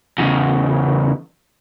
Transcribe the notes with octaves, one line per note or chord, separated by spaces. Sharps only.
E2 C#3